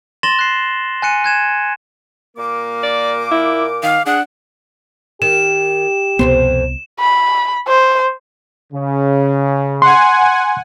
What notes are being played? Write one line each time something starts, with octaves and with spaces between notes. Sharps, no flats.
C6 A6 A#6 E7 F#7 G7
F#6 C7
G#5 F#6 C#7 D#7
F#6 G#6 E7
A#2 A#3 A#4 D6
D5
E4
D#3 F5
D4 G#4 F#5
D#3 G4 E7
C2 F2 B2 B3 C5
B5
C5
C#3
F#5 G#5 C6